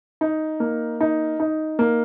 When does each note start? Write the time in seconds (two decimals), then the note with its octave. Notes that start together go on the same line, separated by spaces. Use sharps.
0.21 D#4
0.60 A#3
1.01 D#4
1.40 D#4
1.79 A#3